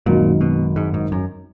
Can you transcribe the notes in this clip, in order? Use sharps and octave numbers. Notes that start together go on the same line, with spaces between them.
G#1 F#2 A#2 D#3 F#3
B2
G#2
G#2
F#2